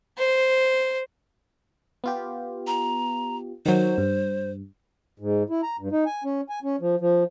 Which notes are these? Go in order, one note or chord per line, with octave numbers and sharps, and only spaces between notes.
C5
B3 F4 G4
A#5
D#3 F#3 C5
G2
G#2
E4
A#5
G2
D#4
G#5
C#4
G#5
C#4
F3
F3